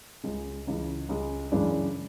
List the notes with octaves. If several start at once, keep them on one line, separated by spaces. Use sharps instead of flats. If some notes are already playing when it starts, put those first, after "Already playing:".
C#2 C#3 G#3
C#2 C#3 E3 G#3
C#2 C#3 G#3
F#2 C#3 E3 G#3 D4